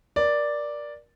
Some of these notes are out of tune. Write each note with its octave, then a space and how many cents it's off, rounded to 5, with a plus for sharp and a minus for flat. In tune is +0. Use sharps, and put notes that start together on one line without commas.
A#4 +25 D5 +0